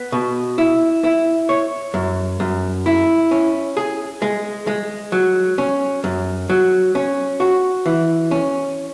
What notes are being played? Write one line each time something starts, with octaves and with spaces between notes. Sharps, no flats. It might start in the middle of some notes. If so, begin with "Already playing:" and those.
Already playing: B3
B2
E4
E4
C#5
F#2
F#2
E4
C#4
G#4
G#3
G#3
F#3
C#4
F#2
F#3
C#4
F#4
E3
C#4